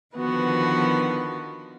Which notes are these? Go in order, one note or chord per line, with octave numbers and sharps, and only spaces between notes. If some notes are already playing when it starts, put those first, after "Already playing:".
D3 D#3 F3 B3 F#4 B4